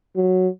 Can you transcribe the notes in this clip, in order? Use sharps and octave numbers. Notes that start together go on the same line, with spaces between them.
F#3